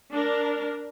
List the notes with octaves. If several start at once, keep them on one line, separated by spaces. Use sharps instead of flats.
D4 A#4